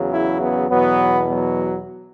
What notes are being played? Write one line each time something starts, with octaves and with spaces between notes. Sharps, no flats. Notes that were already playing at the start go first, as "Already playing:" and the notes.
Already playing: E2 C#3 F#3
E4
B3
E2 B2 F#3 B3
F#3